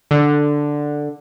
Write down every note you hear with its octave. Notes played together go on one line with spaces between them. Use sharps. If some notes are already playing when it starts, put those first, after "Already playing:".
D3